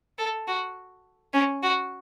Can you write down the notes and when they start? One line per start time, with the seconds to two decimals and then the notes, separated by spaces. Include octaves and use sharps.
0.18 A4
0.48 F#4
1.34 C#4
1.63 F#4